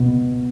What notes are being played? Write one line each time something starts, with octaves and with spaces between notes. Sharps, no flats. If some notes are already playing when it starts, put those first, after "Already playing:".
Already playing: C#2 B2 B3